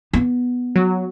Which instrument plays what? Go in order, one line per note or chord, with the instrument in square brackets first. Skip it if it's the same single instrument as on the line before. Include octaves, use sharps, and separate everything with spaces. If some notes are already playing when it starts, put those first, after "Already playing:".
[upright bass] B3
[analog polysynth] F#3